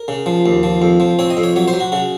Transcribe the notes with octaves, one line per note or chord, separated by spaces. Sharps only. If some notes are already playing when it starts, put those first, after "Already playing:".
Already playing: A#4
C#3
F3
D#2
F3
F2
F3
C4 C#5
D#5
F2
C#5
F#3 C#5
C5
F#3
F#4
C#3 F#4